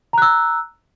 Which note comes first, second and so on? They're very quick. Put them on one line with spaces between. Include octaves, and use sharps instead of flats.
A#5 F#6 E6